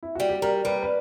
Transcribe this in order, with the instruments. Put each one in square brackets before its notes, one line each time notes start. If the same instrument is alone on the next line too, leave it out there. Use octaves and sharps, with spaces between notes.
[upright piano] E4
[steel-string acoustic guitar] G3 [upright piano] F#4
[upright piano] G4
[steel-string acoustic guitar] G3 [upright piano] A#4
[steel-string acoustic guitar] G3 [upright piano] B4
[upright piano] B4